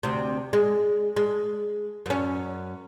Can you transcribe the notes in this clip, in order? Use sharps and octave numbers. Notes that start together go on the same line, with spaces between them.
D2 C3
G#3
G#3
F#2 C#4